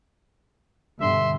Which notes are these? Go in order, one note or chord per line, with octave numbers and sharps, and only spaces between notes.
G2 B2 D3 E5 C6